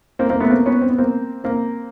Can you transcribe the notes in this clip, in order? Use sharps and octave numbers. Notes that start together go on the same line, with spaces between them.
A#3 C4
A#3 C4
A3 B3
A#3 C4
B3 C#4
C4
B3
A#3 C4
A#3 C4